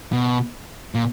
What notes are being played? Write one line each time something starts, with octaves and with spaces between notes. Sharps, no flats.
B2
A#2